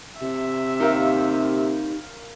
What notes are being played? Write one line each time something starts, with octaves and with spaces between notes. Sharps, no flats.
C3 E5
D#4 G4 A#4 F5